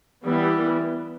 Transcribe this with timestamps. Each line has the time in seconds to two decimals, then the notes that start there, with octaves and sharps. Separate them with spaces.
0.23 E3 G3 B3